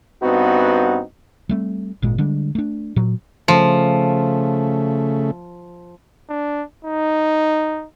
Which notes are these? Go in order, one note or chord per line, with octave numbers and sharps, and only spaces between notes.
G2 B3 C4 D#4 F#4
G3 A3 C4
G#1 A#2 G#3
D3 G3 G#3 D4
A3 D4
A#2 F#3
C#3 F3 A3
D4
D#4